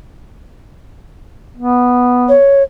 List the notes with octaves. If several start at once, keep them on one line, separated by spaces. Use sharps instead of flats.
B3
C#5